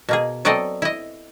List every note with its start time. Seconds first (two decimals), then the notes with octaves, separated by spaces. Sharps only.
0.09 B2 A#3 G#4
0.45 F#3 B3 C4 A4 D5 D#5
0.82 E4 D#5